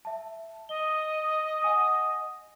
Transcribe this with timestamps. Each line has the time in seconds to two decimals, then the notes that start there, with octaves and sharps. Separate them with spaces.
0.05 E5 A5
0.69 D#5 G7
1.62 F#5 G#5 D#6